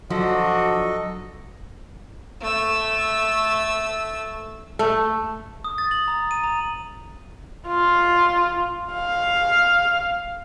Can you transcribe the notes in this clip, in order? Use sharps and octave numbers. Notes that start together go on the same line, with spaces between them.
F3 F#3 D4 F#4 A4 D#5
A3 E6
A3
D#6
A6
F#7
A#5
D#7
A#5
F4
F5